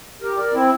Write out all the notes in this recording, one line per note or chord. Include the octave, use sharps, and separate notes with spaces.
G4 A#4
A#4 D5
C4 E4